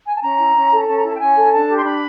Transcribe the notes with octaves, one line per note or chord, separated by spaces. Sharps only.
G#5
A5
C#4 A#5
E4
C#4
A4
C#4 A5
A#5
E4 A5
G5
C#4 G#5
A4
D4 A5
G4
C6
D4 B5